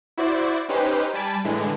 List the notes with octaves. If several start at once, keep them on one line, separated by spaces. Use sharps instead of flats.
E4 F#4 C5 D5
C#4 D#4 G4 B4 C5
G3 G#5 A5 B5 A6 D7
A2 D3 E3 G#3